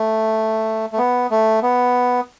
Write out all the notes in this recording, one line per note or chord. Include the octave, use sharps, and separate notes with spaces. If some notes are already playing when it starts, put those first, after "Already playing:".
Already playing: A3
A3
B3
A3
B3